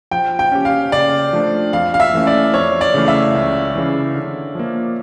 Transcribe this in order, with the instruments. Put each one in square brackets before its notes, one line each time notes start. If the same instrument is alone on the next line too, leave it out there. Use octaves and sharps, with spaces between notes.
[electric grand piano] F3 [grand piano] G5
[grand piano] G5
[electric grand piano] C#4 G4
[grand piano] F5
[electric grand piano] C#3 [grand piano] D5
[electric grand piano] F3 A3 D4
[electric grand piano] F2 [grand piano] F5
[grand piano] F5
E5
[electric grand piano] E3 A3 C#4
[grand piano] D5
[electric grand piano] F2 [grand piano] C#5
[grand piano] D5
[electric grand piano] C#3 E3 A3
[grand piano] E5
[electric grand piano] C#2
C#3 E3
D3
F3 A#3